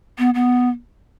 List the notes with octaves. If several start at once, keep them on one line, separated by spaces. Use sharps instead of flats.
B3
B3